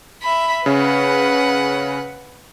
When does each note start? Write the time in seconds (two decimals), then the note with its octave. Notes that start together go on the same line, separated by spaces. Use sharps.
0.22 E5 B5
0.66 C#3 C#4 B4 F#5